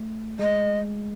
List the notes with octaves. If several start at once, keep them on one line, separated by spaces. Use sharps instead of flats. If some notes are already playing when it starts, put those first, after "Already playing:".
Already playing: A3
G#3 D#5